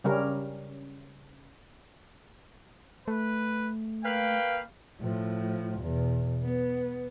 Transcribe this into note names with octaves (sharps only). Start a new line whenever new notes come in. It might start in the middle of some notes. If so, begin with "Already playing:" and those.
C#3 G3 C#4 A#4
A3 B4
A#3 B4 F5 G5
A2 F3
E2 B2
B3